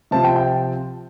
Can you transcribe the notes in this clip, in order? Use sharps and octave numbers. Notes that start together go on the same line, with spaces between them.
C3 F3 C4 F4 A5
G5
G5